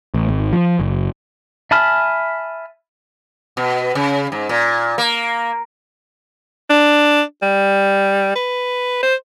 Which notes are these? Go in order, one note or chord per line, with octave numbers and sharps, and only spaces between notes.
A1
G#1
F3
F#1
E5 G#5 A5 B5 F6
B2
C#3
G#2
A#2
A#3
D4
G3
B4
C5